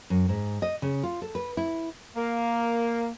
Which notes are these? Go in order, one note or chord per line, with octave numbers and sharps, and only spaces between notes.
F#2
G#2
D#5
C#3
F4
A4
B4
E4
A#3